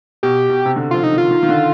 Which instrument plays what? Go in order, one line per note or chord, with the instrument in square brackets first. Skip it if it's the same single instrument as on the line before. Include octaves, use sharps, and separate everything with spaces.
[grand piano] B2 [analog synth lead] G4
[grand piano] B2
C3
D3
[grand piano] F3 [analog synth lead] F4
[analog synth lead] D#4
[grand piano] D#3 [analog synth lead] F4
[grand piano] D#3
D#3
D3